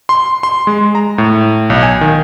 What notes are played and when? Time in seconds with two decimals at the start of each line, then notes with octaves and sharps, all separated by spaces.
0.09 C6
0.43 C6
0.67 G#3
0.95 A#5
1.18 A2
1.70 B1
1.83 G#5
2.01 D#3